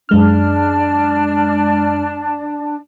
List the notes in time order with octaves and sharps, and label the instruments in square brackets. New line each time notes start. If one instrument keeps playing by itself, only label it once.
[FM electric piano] F#2 G#3 F6 [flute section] D4